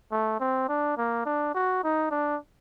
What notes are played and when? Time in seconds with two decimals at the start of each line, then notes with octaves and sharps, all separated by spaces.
0.12 A3
0.40 C4
0.69 D4
0.97 A#3
1.26 D4
1.55 F#4
1.84 D#4
2.11 D4